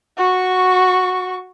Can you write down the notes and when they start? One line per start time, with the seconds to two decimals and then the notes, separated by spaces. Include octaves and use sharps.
0.17 F#4 C#6